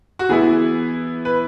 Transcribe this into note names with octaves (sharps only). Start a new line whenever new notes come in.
F#4
E3 B3 E4 G#4
B4